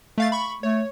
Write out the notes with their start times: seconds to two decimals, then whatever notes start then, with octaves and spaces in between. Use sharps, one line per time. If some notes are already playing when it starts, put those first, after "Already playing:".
0.18 A3 F5 A6
0.32 B5 C#6
0.63 A3 C#5